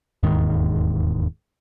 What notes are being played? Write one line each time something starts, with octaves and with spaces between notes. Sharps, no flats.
E1 D#2 G#2 D#3